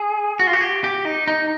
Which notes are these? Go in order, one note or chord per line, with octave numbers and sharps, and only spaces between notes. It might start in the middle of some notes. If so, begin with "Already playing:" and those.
Already playing: G#4
F#4
F4
F#4
G4
G4
D#4
D#4